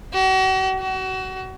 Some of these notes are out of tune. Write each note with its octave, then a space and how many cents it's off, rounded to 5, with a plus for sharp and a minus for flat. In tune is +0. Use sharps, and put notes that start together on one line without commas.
F#4 +40
F#4 +30